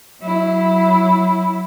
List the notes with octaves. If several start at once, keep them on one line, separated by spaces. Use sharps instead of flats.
F#3 E4